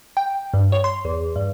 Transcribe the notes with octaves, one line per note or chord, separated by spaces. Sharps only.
G5
G2
C#5
C6
E2
G2